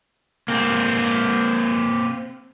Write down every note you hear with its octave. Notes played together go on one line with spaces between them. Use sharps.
A#3 C4